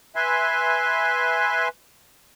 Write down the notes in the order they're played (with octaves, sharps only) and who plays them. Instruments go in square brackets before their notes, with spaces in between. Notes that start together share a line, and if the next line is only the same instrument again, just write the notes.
[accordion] B4 E5 G#5 C6